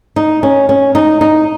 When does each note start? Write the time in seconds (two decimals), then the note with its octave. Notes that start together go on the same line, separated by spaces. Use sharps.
0.16 D#4
0.43 C#4
0.69 C#4
0.95 D#4
1.21 D#4